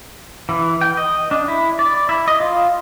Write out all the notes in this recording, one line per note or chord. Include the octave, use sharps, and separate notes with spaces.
E3
G5
D#5
D4
E4
D5
E4
D#5
F4